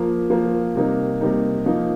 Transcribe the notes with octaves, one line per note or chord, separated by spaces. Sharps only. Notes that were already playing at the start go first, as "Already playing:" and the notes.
Already playing: F3 A#3 F4
F3 A#3 F4
C3 G3 A#3 D#4
C3 G3 A#3 D#4
F3 A#3 D#4